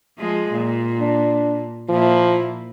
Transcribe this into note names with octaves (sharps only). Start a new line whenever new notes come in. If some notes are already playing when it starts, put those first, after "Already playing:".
F3 G#3
A#2
D4
A#2 F3 A#3 E4